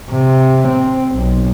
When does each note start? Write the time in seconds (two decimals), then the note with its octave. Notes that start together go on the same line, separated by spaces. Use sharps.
0.11 C3
0.69 C4
1.16 B1